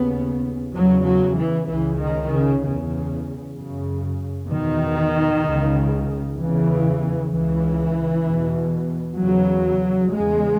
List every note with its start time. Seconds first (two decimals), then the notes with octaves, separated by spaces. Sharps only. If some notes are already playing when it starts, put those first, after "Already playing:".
Already playing: D#2 C#3 B3
0.73 E2 C#3 F#3
1.05 F#3
1.36 E3
1.67 C#2 C#3 E3
1.99 D#3
2.30 C#3
2.61 E2
2.66 C#3
3.55 F#2 C#3
4.49 E2 B2 D#3
5.43 C#2 C#3
6.37 E2 C#3 E3
7.31 C#2 C#3 E3
8.25 E2 B2
9.19 E2 C#3 F#3
10.12 E2 C#3 G#3